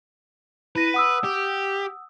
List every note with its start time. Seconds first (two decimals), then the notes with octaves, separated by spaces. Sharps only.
0.76 E4 B4 A#6 D#7
0.94 F#5 D#6 E6
1.24 G4